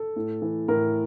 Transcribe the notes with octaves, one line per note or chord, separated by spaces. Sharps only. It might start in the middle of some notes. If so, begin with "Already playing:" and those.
Already playing: A4
A2
E3
A2 A#4